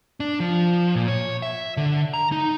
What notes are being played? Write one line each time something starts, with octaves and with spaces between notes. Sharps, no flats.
D4
F3
A#2
C#5
E5
D3
A#5
D#4